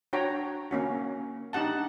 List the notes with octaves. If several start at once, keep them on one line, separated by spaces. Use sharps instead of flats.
D4 F#4 C#5 G5 A#5
A#3 C#4 F#4
D4 D#4 G4 F#5 A5